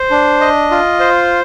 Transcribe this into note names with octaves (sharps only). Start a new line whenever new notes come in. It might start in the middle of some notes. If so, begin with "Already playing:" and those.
Already playing: C5
D4
D#5
F4
C5